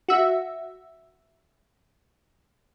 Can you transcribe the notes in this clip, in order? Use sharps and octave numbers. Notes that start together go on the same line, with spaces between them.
F#4 E5